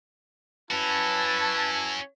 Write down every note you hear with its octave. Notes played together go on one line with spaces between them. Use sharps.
C#4 E4 F#4 B4 A5